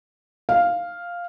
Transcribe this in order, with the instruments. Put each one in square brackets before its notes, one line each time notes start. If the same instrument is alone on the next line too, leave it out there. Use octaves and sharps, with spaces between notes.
[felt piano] F5